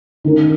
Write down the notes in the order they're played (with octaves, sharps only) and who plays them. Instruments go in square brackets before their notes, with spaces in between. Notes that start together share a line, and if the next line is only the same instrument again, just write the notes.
[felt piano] D#3 C#4 A#4